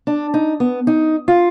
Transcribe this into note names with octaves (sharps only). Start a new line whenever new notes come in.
D4
D#4
B3
D#4
F4